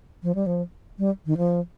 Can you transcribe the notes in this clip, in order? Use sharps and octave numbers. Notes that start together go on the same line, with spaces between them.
F3
G3
F3
G3
D#3
F3